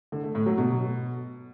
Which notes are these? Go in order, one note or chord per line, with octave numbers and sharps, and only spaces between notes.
D3
A3
A2
F#3
B2